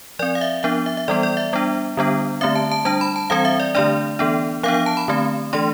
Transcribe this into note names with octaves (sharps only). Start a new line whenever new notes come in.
F3 C4 D5
F5
E5
F3 B3 D4 E5
E5
E5
E3 G3 B3 D5
D5
E5
G3 B3 D4
D3 G3 B3 D4
D3 A3 C4 E5
A5
A5
G3 D4 A5
B5
A5
E3 G3 C4 F5
E5
D5
D3 A3 D4 D5
E3 B3 D4
F3 B3 D4 F5
F5
A5
B5
D3 A3 C4
E3 A3 D4 C6